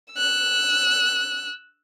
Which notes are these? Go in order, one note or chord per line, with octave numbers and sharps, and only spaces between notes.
E6 F#6